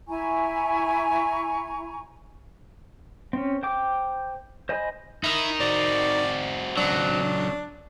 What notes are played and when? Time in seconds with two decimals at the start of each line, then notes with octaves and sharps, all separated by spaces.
0.08 E4 G#5 A#5 C#6
3.33 C4 C#4
3.63 C5 G5 D6
4.69 C5 D#5 G#5 B5
5.24 D#4 E4 A#4
5.60 C4 F#4 D5
6.77 C#2 F#3 D4